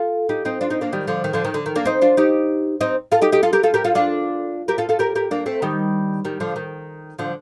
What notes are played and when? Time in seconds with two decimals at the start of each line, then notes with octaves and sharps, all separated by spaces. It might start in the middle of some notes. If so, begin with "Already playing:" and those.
Already playing: F4 A4
0.29 D#4 G4
0.45 C4 D#4
0.61 D4 F4
0.70 C4 D#4
0.81 A#3 D4
0.93 D#3 G3
1.07 D3 F3
1.24 D#3
1.33 D3 F3
1.44 D#3
1.54 D3
1.66 D#3
1.76 A#3 D4
1.85 C4 D#4
2.02 D4 F4
2.17 D#4 G4
2.81 C4 D#4
3.11 F4 A4
3.22 D#4 G4
3.32 D#4 G4
3.43 F4 A4
3.53 G4 A#4
3.63 F4 A4
3.74 G4 A#4
3.84 F4 A4
3.95 D4 F4
4.68 G4 A#4
4.78 F4 A4
4.89 F4 A4
4.99 G4 A#4
5.15 G4 A#4
5.31 A#3 D4
5.46 A3 C4
5.62 D#3 G3
6.25 D#3 G3
6.40 D3 F3
6.56 D#3
7.19 D3 F3